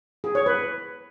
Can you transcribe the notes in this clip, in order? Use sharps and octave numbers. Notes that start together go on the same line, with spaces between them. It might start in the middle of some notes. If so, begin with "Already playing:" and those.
G#4
C#5
B4